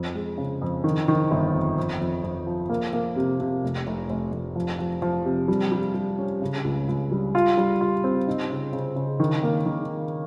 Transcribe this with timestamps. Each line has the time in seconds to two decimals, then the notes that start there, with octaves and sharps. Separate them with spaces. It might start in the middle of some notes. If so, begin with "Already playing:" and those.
Already playing: F2
0.15 G#3
0.38 C#3
0.62 F2
0.84 D#3
1.08 D#3
1.31 G1
1.53 F2
1.77 F2
2.01 F2
2.24 F2
2.47 F3
2.69 A#3
2.93 A#3
3.16 C3
3.40 C3
3.64 F1
3.87 F1
4.10 F1
4.32 F1
4.56 F3
4.79 F3
5.02 F3
5.25 C3
5.48 G3
5.72 G3
5.94 G3
6.18 C#4
6.42 C#3
6.64 C#2
6.88 C#2
7.12 G3
7.35 F4
7.58 G3
7.81 F4
8.04 C4
8.27 D#4
8.50 C#3
8.73 C#3
8.96 C#3
9.20 D#3
9.43 A#3
9.66 D#3